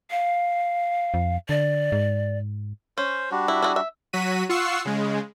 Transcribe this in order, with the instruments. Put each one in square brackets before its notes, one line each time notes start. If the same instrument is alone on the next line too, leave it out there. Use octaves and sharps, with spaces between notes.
[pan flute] F5
[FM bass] F2
[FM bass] D3 [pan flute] D5
[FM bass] G#2
[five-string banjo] C#4 [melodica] C5
[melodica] G3 D4 F#4
[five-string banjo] E4
E4 F4 G#4
E5
[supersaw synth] F#3 F#4 B6 D#7
F4 F#5 C#6 E6 C7
C#3 G#3